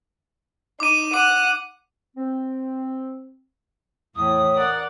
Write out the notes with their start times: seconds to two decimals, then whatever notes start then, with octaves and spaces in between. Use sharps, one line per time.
0.80 D#4 D6 D#7
1.14 F#5 D6 D#7
2.16 C4
4.16 E2 A2 D#6
4.54 A#4 D5 F#5